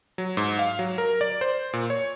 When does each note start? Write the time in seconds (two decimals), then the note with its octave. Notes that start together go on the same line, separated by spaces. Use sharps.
0.18 F#3
0.37 G#2
0.59 F5
0.79 F#3
0.98 A#4
1.21 D5
1.41 C5
1.73 A#2
1.90 C#5